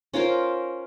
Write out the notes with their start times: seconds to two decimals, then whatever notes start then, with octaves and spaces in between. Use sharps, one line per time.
0.14 C#4 F4 A#4 C5